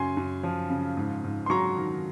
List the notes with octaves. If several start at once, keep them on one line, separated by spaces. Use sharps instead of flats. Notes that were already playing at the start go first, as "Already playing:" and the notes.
Already playing: F#2 C#3 G#5 C6
F#2
F3
C#3
G#2
G#2
C6
F#3 A#5 C#6
D#3